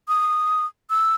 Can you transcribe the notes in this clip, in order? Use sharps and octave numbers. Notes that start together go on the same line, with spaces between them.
D#6
E6